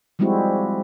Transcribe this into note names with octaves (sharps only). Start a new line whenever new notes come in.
F3 G3 G#3 C4 E4 F#4